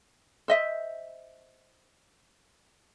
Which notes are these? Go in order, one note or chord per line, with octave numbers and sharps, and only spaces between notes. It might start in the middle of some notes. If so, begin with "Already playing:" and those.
C5 D#5 E5